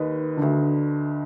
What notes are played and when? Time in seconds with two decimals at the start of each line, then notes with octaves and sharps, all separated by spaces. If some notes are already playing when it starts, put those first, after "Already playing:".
Already playing: D#2 D#3 B4 D#5
0.37 D2 D3